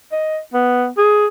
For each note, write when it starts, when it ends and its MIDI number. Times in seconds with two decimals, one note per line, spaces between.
0.12 0.39 75
0.53 0.88 59
0.97 1.26 68